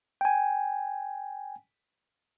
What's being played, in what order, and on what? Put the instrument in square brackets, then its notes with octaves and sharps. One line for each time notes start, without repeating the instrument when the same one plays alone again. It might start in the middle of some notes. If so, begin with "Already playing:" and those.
[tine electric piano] G5 G#5